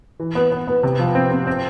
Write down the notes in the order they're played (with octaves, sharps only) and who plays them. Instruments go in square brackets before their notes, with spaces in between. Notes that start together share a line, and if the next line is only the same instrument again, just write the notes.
[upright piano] E3
B3
B3
B3
C3
F3
C4
C4
C4